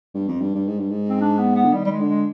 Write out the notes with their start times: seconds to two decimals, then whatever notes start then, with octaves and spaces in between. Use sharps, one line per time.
0.14 G2
0.28 F2
0.41 G2
0.55 G2
0.67 G#2
0.78 G2
0.90 G#2
1.10 C4
1.21 D4
1.38 B3
1.56 B3
1.65 D3
1.73 D#3 G3
1.85 G3
1.92 G#3
2.00 D3
2.09 G#3